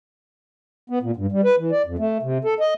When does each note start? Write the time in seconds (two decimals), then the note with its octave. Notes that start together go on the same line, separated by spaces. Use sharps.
0.90 B3
1.03 A#2
1.16 G2
1.32 G3
1.45 B4
1.58 E3
1.71 D5
1.86 F2
1.98 A3
2.22 C3
2.44 A4
2.60 D#5